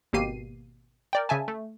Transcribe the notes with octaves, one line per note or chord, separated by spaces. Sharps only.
G#1 B2 A#3 G4 C7 D#7
A#4 D5 G5
C#3 E5 G#5 A5
A3